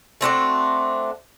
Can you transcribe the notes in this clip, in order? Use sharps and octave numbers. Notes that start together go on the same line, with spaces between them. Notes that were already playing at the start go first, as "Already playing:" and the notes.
A3 C4 D4 F#4